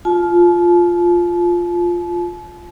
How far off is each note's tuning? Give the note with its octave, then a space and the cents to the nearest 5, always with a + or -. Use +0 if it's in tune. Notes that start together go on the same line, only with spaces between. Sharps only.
F4 +0 A5 -40